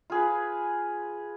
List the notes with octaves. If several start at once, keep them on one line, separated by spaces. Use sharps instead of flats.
F4 G#4 B4